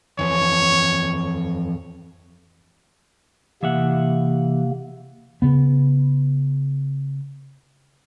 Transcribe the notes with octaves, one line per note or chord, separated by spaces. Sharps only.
F2 E3 C#5
C3 E3 A#3 E5 F#5
C#3 B3